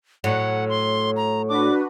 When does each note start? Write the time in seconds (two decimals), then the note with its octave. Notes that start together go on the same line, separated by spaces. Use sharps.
0.24 A2 F#3 F#5
0.69 C6
1.16 A#5
1.49 D4 F#4 B4 D6